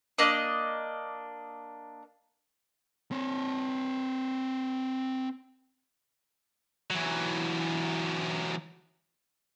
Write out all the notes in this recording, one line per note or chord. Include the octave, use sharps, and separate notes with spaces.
A#3 D4 D#5
C4 C#5
E3 F#3